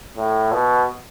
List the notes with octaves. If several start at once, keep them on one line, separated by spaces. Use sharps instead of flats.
A2
B2